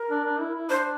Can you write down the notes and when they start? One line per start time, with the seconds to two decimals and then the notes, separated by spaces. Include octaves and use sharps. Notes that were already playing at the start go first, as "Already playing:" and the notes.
Already playing: A#4
0.10 D4
0.24 D4
0.40 E4
0.55 E4
0.70 D4 C5